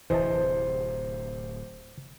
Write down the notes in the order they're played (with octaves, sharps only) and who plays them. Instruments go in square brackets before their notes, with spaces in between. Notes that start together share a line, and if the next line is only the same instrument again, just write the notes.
[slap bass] D1 C3 [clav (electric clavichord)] E3 D#5 A5 [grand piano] C5